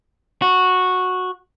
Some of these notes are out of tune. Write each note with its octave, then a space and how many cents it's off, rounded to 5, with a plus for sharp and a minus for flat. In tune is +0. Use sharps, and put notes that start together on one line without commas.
F#4 -10